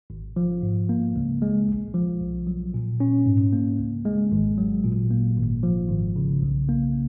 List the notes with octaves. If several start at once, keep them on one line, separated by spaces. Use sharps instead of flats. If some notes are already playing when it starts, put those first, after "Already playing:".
G#1
F3
G#2
A#3
C#2
G#3
A#1
F3
B1
F#3
A#2
C#4
G#2
A#3
C#2
G#3
G#1
F#3
A#2
A#3
G#1
F3
G#1
C#3
B1
A#3